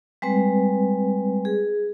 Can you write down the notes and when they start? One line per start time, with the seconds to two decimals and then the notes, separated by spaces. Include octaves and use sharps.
0.22 G3 G#3 C4 B4
1.45 G#4